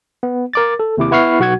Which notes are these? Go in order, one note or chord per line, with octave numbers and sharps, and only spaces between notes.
B3
A#4 D6 A6
A4
D#2 C3 E4 D6
B3 E4 F#5 C#6 F6 C7
B1 F#4 F#5 G#6